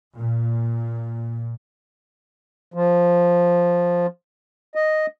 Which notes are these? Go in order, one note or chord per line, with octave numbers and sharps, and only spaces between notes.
A#2
F3
D#5